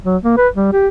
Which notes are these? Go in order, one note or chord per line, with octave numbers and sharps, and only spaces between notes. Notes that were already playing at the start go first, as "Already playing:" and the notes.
F#3
A#3
B4
G3
G4